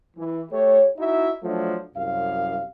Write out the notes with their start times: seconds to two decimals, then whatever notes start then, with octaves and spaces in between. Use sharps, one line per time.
0.17 E3
0.51 A3 G4 C#5
0.97 D#4 E4 F#4 E5
1.42 F3 F#3 A3 D4
1.94 C2 F#2 F5